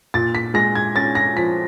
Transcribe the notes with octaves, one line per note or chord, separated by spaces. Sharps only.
A#2 A6
B6
G#3 A#6
G#6
C#4 A6
A#6
F3 B6